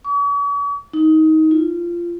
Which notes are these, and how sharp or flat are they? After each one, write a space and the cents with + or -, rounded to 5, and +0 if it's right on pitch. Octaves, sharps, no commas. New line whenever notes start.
C#6 +45
D#4 +20
F4 -20